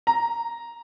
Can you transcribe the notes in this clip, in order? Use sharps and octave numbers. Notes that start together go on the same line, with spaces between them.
A#5